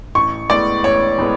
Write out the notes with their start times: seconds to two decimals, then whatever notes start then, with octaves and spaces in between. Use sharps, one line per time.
0.15 A1 C#6
0.50 A2 G#3 B3 D5
0.84 A1 C#5
1.19 A2 G#3 B3